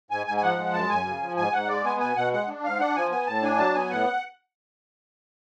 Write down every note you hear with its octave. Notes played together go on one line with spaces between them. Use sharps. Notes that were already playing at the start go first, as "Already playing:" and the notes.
G#2 G#5
G#2 G#5
G#5
F3 F#5
G#3
F#2 A5
F#2 G#5
C#3
F3
G#2 G#5
G#2 F#5
G#3 D5
B3 G#5
B2 G#5
B2 F#5
G#3 F#5
D4
G#2 F5
D4 F#5
F3 G#5
B3 G#5
A2 A5
D4 G#5
F#3 A5
B3 G#5
A2 F#5